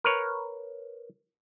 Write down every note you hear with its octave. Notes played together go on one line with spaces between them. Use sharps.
A#4 B4 C#5